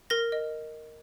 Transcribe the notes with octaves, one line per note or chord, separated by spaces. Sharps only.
A#4 A#6
D#5